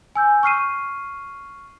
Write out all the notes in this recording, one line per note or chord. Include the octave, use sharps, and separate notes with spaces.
G#5 E6 G6
C#6 F6 C7 D#7